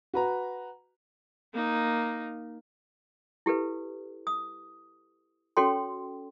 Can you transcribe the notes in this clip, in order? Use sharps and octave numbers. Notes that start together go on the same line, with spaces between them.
F#4 B4 A#5
A#3 D#4
E4 G4 A4 B4
D#6
C#4 F#4 A4 C#5 G5 C6